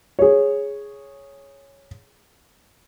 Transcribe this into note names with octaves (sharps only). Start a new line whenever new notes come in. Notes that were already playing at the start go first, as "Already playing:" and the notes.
G#4 C#5